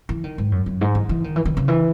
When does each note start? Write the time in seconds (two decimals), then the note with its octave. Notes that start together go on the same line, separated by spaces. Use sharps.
0.09 E3
0.24 D#3
0.38 G#2
0.52 F#2
0.66 F#2
0.81 G#2
0.95 E3
1.09 E3
1.24 D#3
1.36 E3
1.45 D#3
1.57 C#3
1.68 E3